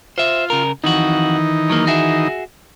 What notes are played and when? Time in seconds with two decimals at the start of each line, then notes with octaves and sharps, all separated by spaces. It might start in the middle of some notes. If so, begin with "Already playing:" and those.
0.18 F4 C5 E5
0.50 C#3 A#4
0.84 F2 D#3 E3 D#4 F#4
1.70 F#3 A#3
1.87 F#4 G#4 E5